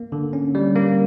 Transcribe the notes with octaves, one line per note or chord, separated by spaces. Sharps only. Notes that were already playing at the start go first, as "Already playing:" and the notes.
Already playing: A#3
D3
C#4
G3
A#3